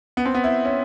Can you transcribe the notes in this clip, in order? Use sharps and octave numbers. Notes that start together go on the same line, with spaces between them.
B3
C4
B3
E4
C#4